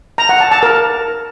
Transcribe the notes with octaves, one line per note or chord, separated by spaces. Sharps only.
A#5
F#5
A5
A5
A#4